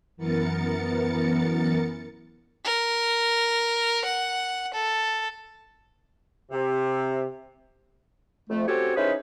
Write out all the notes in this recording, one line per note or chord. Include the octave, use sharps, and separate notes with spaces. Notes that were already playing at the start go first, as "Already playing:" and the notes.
F#2 E3 B3 A#4 A6 C#7
A#4
F#5
A4
C3
F2 A3
C4 C#4 F#4 G4 A4 C#5
C#4 D#4 E4 G#4 B4 C5